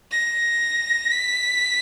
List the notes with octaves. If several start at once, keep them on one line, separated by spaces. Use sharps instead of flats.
A#6
B6